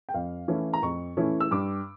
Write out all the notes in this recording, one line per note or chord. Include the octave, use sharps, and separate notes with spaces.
G5
F2 F5
E3 A3 C#4 E4
A#5
F2 C#6
E3 A3 C#4 E4
E6
G2 D6